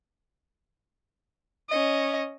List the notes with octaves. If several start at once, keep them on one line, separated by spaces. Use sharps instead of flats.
C#4 D#5